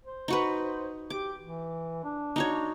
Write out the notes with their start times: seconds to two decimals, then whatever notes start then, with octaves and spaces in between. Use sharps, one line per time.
0.05 C5
0.28 D#4 F#4 B4
1.10 G4 D6
1.41 E3
2.04 D4
2.36 D#4 F#4 C#5